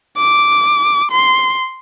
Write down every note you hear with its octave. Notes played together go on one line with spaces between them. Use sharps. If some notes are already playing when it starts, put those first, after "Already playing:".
D6
C6